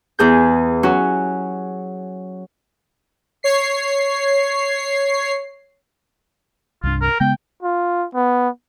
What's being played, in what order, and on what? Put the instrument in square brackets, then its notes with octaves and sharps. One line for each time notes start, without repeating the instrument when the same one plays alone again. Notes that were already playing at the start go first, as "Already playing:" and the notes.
[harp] E2 G#4 G6
F#3 C#4 F#4
[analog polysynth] C#5 C7
[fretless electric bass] C2 G2 D4 [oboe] F4
[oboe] A#4
[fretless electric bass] C#3 G#3 B3 [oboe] G5
[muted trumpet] F4
B3